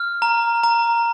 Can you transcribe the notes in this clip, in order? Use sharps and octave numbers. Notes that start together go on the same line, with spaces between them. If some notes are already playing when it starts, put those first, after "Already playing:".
Already playing: F6
A#5
A#5